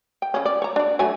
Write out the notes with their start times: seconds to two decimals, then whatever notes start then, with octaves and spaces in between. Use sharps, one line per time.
0.22 G5
0.34 C#3 C#4
0.46 D5
0.62 C#5 A#5
0.76 D4 D5
0.99 F#3 A3 G#5